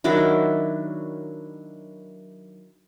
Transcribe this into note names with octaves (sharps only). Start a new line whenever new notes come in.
D#3 F#3 D4 E4